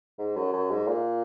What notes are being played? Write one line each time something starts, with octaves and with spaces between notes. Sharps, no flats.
G#2
F#2
F#2
G#2
A#2